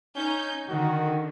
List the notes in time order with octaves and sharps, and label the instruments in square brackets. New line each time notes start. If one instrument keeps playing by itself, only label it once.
[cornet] C#4 [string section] D#4 G6
[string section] D3 [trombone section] D#3 [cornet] F#4